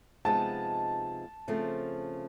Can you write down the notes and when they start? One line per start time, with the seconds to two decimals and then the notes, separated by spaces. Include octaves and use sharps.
0.25 C3 F3 G#3 B3 D#4 A5
1.48 C#3 F3 A3 C4